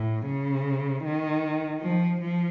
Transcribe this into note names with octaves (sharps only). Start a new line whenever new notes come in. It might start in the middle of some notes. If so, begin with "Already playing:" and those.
Already playing: A2
C#3
D#3
F3
F3